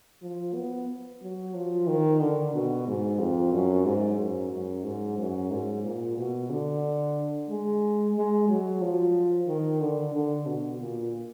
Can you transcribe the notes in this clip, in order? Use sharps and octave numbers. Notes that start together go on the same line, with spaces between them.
F3
B3
F#3
F3
D#3
D3
B2
G#2
F2
F#2
G#2
F#2
F#2
G#2
F#2
G#2
A#2
B2
D3
G#3
G#3
F#3
F3
D#3
D3
D3
B2
A#2